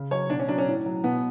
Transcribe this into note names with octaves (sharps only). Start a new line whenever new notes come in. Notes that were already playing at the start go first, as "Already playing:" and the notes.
Already playing: C#3
F#3 C#5
B2 D4
C#4
F#3 D4
C#4
A2
F#3
B2 B3